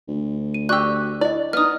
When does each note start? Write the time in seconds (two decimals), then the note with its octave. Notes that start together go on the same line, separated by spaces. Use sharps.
0.08 D2
0.54 D#7
0.69 F#4 G4 D5 C#6 D6 E6 F#6
1.21 E4 D5 D#5
1.53 B3 D#4 D#6 F6